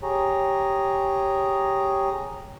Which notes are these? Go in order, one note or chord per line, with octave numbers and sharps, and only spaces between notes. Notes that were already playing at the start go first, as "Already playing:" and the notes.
G4 G#4 C#5 A#5